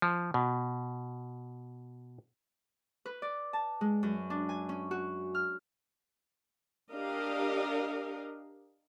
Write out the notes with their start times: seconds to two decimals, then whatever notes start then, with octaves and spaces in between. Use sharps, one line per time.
0.02 F3
0.34 B2
3.05 B4
3.22 D5
3.53 A5
3.81 G#3
4.03 F#2
4.30 D4
4.49 G#5
4.69 C#4
4.91 F#4
5.35 F6
6.93 D4 G4 A#4 D#5 F5